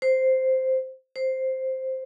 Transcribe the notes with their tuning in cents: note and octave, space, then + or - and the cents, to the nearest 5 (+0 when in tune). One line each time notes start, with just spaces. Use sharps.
C5 -5
C5 +0